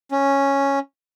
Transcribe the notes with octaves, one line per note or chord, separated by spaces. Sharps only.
C#4